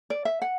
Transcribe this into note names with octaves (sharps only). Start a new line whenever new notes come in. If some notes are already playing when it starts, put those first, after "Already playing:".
D5
E5
F#5